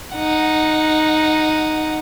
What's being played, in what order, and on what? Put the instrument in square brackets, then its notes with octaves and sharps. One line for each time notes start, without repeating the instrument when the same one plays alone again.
[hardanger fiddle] D#4 F#5